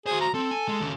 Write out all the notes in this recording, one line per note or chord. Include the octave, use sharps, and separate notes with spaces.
F#4 G#4 C5
A#5
C4 A4
G#5
G#3
D#2 C#3